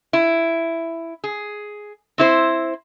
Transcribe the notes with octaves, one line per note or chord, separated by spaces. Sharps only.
E4
G#4
C4 E4 C5